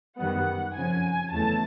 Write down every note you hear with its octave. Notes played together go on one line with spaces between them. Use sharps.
F#2 D#3 G3 B3 F#5
F2 C#3 F3 G#5
E2 C#3 F#3 A3 A5